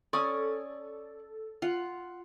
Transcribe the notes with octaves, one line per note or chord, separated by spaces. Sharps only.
C#4 A4 D5 G#5 C#6 D#6
F4 F#5